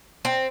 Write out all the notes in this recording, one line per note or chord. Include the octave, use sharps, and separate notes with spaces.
C4